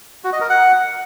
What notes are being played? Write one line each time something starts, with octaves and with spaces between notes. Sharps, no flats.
F#4
D#5
A#4
F#5